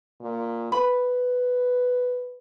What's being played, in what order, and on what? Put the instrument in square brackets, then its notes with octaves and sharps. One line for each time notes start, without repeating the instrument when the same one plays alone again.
[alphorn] A#2
[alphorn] B4 [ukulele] B5